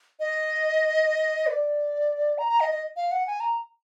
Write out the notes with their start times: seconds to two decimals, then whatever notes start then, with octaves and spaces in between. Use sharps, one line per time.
0.20 D#5
1.47 B4
1.51 D5
2.38 A#5
2.49 A#5
2.60 D#5
2.71 D#5
2.96 F5
3.11 F#5
3.27 G#5
3.40 A#5